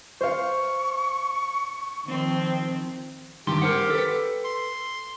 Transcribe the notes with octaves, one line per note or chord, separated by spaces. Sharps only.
C5 F5 C#6
D#3 F3 C4
G2 D#3 G4 C6
A#4 C5 F#5
A4 B4
C6